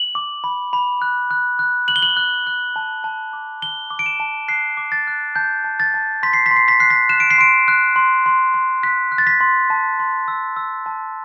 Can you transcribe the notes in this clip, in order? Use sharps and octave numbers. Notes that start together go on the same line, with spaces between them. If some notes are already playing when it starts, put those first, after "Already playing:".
Already playing: F#7
D6
B5
B5
F#6
F#6
F#6
F#6 F#7
G7
F#7
F#6
F#6
A5
A5
D6
F#6 G7
D6
D7
E7
A5
F#6 C7
D6
A6
F#6
A5 G6
A5
A6
A5
C6 B6
C7
B6
C6
C7
B6
F#6 C7
B6
F#6 E7
D7
C7
C6 D7
F#6
C6
C6
C6
F#6 B6
F#6
A6
B6
C6
A5
C6
E6
E6
A5